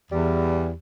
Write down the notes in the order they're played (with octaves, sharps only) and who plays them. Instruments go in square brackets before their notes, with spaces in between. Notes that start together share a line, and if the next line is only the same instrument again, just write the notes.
[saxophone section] E2 [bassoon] G3